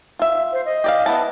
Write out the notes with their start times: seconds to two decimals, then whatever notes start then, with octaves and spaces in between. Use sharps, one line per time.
0.19 F4 E5
0.53 C5
0.66 D#5
0.84 G4 D5 F5
1.06 B3 E4 A5